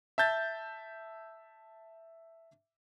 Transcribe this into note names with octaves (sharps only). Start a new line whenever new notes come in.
E5 A5 G6 A6